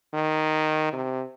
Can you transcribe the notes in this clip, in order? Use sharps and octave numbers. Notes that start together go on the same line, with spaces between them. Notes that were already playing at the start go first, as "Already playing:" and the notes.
D#3
C3